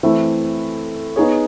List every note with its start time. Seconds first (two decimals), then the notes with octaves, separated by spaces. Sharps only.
0.03 E3 A3 C4 E4
1.16 B3 D#4 G#4 C#5